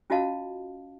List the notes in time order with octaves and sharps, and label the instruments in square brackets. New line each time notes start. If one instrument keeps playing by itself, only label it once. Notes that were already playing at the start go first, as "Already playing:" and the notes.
[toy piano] C#4 F4 F#4 D#5 F5 A5